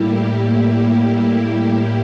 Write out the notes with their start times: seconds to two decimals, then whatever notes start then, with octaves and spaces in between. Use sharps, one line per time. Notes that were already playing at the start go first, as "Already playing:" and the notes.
Already playing: A2 G3 A#3 E4 G4